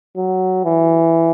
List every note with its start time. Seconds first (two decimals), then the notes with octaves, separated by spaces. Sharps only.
0.17 F#3
0.65 E3